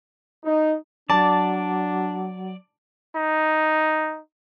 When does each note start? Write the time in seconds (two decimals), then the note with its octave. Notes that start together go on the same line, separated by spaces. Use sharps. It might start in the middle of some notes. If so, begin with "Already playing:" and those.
0.44 D#4
1.10 F#3 D4 D5 A5
3.16 D#4